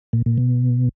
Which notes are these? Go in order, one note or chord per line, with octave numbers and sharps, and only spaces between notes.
A#2
A#2
B2